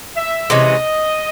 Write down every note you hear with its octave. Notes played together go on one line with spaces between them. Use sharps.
E5
C3 E3 G#3 C#4 D#5